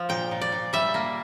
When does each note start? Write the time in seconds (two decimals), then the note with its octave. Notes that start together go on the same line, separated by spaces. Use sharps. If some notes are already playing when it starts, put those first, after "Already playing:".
Already playing: F3
0.09 A#2 G5
0.31 A#2
0.41 D5
0.52 A#2
0.73 G3 E5
0.94 A#3